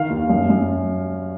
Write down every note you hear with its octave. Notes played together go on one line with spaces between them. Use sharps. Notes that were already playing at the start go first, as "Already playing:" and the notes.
Already playing: D#3 F5
D#2
F#2
F#2